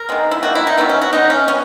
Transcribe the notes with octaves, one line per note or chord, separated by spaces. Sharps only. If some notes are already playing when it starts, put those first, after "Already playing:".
Already playing: A#4
D#3 G#3 B3
E4
D#3 A#3 F#4
E4
D#4
D#3 F#3 B3 E4
C#4
F#4
E3 B3 D#4
C#4
B3 C#4